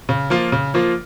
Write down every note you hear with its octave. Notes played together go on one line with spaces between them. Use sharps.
C#3
F3 A#3 F4
C#3
F3 A#3 F4